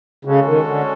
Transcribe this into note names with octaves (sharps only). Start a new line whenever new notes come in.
C#3 G#3 C#4 F#4 A4
D#3
D3